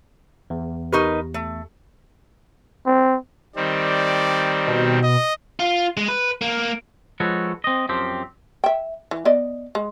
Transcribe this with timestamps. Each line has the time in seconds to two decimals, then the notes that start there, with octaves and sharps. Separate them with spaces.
0.50 E2
0.93 D#4 G4 A#4 B4 C#6
1.34 A3
2.86 C4
3.56 D#3 G3 C4 D5
4.67 B2
5.03 D#5
5.60 F4
5.97 G#3
6.08 B4
6.41 A#3
7.20 F3 G#3 F#4 A4 B4 C#5
7.64 C4 D#5
7.89 F#2 F3 C4 G4
8.64 E5 G5
9.11 E3
9.25 B3 D5 D#5
9.75 G#3